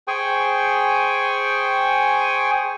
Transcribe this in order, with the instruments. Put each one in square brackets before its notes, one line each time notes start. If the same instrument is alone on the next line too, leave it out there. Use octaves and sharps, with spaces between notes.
[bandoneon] G#4 C5 G5 G#5 C#6